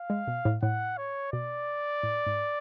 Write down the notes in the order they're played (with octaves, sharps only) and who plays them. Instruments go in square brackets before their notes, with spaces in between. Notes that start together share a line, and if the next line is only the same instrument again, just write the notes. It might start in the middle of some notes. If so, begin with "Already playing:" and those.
Already playing: [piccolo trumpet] F5
[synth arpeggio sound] G#3
B2
A2
[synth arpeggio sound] A2 [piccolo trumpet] F#5
[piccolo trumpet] C#5
[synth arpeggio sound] B2 [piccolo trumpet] D5
[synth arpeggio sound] A2
G#2